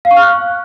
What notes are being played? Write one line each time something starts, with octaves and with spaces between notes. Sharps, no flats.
F5
C#6
F6
F#6